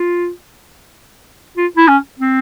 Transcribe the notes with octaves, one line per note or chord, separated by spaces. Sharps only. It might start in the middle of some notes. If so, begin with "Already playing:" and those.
Already playing: F4
F4
E4
C#4
C4